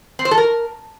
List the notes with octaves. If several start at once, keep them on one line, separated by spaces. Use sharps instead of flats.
C4
C5
A4
A#4